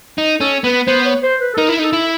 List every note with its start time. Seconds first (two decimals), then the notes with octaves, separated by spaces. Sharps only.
0.18 D#4
0.40 C#4 A4
0.64 B3 B4
0.88 B3 C5
1.06 C#5
1.23 C5
1.41 B4
1.54 A4
1.58 D#4 A#4
1.69 E4
1.79 D#4 A4
1.93 E4